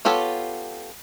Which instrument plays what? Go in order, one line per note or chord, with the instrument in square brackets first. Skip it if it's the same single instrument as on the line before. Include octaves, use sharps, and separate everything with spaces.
[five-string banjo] B3 F4 G4 A4 C#5